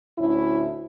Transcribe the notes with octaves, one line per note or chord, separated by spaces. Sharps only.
D2 A2 C#4 E4